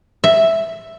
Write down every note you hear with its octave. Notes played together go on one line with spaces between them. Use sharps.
E5